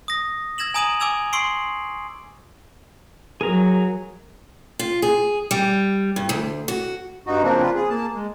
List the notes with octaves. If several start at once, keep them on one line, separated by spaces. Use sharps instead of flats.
D#6 A#6
E6 G#6 A#6 E7 F#7
G#5 A#5 D#6 G#6 D#7 F#7
G#5 D6 E6 G#6 F7
C6 C#6 E6 C7 D7 F#7
F#3 G#4 A#4 A#5
F4
G#4
G3
G2
D2
F#4
G2 D#4 F#4
C#3 F3 A#3 C4 D4
F4 B4
G#4
A#3 A5
G#3